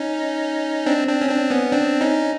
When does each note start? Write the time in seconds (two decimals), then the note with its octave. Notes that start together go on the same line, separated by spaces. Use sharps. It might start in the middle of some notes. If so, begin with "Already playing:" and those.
Already playing: C#4 D#4
0.86 C4 D4
1.07 C4 D4
1.21 C#4
1.29 C4 D4
1.50 B3 C#4
1.72 C4 D4
2.01 C#4 D#4